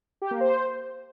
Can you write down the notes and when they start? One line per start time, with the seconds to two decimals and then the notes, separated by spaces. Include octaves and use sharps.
0.22 G4
0.31 A#3
0.40 C5